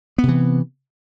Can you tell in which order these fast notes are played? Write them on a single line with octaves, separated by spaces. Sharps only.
B3 C3 E3